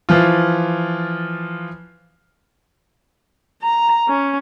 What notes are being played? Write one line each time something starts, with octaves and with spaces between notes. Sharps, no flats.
E3 F3 F4
A#5
C#4